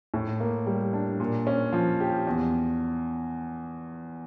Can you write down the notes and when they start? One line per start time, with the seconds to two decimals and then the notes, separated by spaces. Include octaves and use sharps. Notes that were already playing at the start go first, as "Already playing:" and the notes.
0.14 A2
0.40 A#3
0.66 G3
0.93 D4
1.20 A#2
1.47 C#4
1.73 F3
2.00 G4
2.27 E2